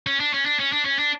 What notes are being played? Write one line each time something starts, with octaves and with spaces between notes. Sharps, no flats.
C#4
D4
C#4
D4
C#4
D4
C#4
D4